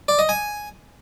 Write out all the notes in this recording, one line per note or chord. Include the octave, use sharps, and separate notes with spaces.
D5
D#5
G#5